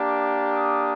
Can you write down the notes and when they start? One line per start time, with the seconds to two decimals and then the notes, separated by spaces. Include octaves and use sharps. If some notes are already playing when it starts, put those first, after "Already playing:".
Already playing: A#3 D4 G4
0.21 D6
0.51 D#6